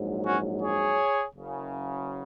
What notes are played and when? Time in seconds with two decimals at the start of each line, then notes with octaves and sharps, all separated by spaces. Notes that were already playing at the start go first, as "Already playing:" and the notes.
Already playing: A#1 G#2 F#3
0.26 C#4 F#4
0.61 G#4 C#5
1.34 F#1 F#2 C#3